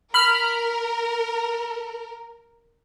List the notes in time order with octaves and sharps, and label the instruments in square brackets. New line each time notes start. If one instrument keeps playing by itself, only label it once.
[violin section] A#4 [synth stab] B5 F6